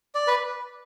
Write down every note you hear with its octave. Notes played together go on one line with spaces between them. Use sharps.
D5
B4